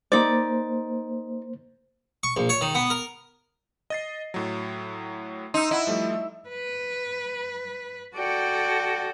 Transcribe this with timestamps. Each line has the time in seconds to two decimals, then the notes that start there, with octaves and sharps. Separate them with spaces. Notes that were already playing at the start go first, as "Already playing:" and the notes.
0.12 A#3 D#4 C5 D5
2.23 C#6
2.37 A#1
2.49 C#5
2.61 D#3
2.75 B3
2.90 A#4
3.90 D#5 A6 C7
4.34 A2 F#3
5.54 D#4 C6 E6
5.71 E4 D#5 F#5
5.87 F3 G3 A3
6.49 B4
8.16 F#4 A4 D5 G5